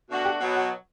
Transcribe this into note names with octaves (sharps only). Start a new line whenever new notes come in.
B2 A3 D4 F#4
G4
B2 F#3 B3 F#4
F#4